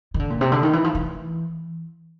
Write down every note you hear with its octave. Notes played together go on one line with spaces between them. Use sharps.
D#3
D3
A#2
C3
D3
D#3
E3
F3
E3